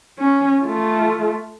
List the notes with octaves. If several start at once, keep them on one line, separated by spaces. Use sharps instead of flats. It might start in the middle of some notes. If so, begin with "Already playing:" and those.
C#4
A3 F4